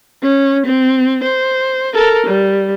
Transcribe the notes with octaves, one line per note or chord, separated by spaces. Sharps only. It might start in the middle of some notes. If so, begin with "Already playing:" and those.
C#4
C4
C5
A4 A#4
G3